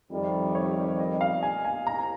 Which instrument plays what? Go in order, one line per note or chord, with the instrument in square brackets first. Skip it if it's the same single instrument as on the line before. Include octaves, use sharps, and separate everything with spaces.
[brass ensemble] F2 C3 D#3 G3
[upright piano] C#5
D#5
F5
G#5
G#5
[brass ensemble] C2 [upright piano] A#5